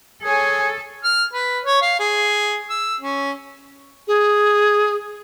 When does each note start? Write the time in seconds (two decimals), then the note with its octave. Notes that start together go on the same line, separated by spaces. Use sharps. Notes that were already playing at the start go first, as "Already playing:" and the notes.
0.24 G#4 A4 C#5 G#5
1.04 F6
1.33 B4
1.64 C#5
1.82 F5
1.99 G#4
2.70 E6
3.01 C#4
4.08 G#4